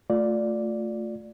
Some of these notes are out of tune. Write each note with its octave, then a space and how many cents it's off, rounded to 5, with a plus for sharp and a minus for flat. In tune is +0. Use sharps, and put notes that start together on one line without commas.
A3 +5 F4 +25 D5 +0